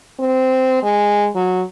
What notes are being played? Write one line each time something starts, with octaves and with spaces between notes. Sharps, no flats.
C4
G#3
F#3